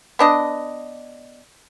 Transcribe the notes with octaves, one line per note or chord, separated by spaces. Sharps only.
B3 D4 D#5